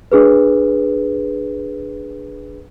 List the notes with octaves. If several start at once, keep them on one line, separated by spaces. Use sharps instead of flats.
D4 G#4 B4